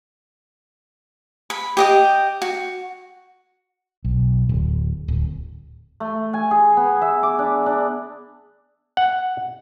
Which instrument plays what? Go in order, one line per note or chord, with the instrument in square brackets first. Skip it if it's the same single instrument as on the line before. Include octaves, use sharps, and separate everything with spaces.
[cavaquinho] B5
G4 D#5 G5
F#4
[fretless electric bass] B1
D1
D1
[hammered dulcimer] A3
G#5
G#4
B3
E5
D6
D4
D4
[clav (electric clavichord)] F#5